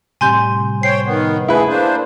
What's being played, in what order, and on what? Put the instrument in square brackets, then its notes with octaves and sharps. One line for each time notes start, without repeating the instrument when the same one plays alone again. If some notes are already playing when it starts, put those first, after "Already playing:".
[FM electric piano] A2 C3 G3 [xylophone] G#5 C6 G6
[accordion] C5 C#5 G5 [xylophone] C7
[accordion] D#3 B3
[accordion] A3 G#4 [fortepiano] E4 B4
[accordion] A#3 D4 C5